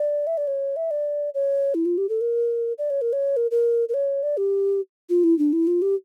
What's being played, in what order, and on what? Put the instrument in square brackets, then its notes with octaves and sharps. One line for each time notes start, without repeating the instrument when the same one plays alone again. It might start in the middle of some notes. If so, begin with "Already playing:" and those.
Already playing: [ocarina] D5
E5
D5
C#5
E5
D5
C#5
E4
F4
G4
A4
A#4
D5
C#5
A#4
C#5
A#4
A#4
A#4
C#5
D5
G4
F4
E4
D4
E4
F4
G4